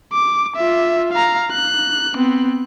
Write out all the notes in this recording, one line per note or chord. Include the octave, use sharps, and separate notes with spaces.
D6
F4 E5
F5 A#5
F#6
B3 C4